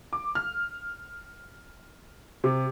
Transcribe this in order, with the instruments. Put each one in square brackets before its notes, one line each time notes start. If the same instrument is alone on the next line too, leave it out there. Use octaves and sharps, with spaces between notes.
[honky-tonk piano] D6
F6
C3